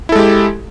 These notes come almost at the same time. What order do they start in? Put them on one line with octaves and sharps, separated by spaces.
E4 A4 G#3 G4